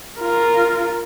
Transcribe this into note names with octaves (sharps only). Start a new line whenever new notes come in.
F4 A#4